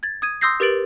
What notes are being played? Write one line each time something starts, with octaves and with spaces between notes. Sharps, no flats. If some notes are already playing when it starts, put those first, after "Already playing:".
G#6 A6
D#6 G#6 D#7
C6 D#6 E6 G6 A#6 C7
G4 A#4 B4 A6 D7 F#7